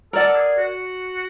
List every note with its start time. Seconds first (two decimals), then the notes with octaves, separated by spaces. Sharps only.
0.13 A4 A#4 D5 F#5
0.28 A4
0.36 G#4
0.58 F#4